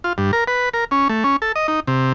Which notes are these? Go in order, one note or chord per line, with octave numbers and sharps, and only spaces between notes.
F4
G2
A#4
B4
A#4
C#4
A3
C#4
A4
D#5
D#4
C3